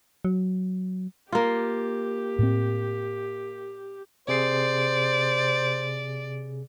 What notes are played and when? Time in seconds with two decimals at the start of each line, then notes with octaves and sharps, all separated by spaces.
0.25 F#3
1.32 A#3 F4 G4
2.39 A2 C4
4.28 C3 G#4 C5 D5 C7